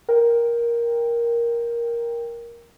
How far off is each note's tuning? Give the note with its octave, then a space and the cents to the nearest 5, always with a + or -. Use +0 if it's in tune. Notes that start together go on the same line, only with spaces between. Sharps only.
A#4 +10 G5 +10